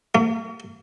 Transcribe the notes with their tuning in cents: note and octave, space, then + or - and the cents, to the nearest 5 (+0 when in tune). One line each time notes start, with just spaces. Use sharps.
A#3 -45